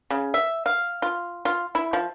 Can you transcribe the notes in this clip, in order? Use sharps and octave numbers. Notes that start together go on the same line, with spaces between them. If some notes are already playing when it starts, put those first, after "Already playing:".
C#3
E5
F5
F4
F4
E4
F3